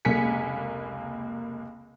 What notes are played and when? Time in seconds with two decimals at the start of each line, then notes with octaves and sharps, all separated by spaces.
0.05 F1 C#2 A#3 G#5 B6 C#7